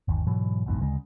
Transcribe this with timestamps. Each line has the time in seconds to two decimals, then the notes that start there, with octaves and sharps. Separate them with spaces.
0.08 G1 D#2
0.27 G#2 B2 E3 F#3
0.66 F#1 B1 E2 G#2
0.81 D2 C#3 G#3